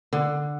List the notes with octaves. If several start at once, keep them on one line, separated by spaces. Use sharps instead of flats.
D3